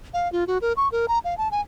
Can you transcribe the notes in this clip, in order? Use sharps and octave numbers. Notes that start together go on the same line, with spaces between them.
F5
F4
F#4
A#4
C#6
A#4
A#5
F5
A5
G#5